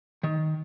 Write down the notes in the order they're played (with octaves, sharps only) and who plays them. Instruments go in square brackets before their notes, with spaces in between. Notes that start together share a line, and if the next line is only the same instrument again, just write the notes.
[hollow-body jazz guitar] D#3